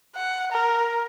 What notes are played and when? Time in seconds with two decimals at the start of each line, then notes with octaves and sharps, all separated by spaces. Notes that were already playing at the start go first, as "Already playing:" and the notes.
0.16 F#5
0.52 A#4